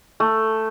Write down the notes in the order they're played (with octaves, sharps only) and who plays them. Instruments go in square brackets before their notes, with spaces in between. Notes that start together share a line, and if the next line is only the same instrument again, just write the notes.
[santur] A3